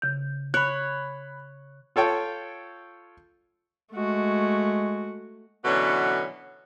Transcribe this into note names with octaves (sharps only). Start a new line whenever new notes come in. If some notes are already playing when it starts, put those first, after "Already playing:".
C#3 G6
C#5 B5 F#6
F4 A4 C#5 G5
G#3 A3 F#4
B2 D3 E3 F#3 B3 C#4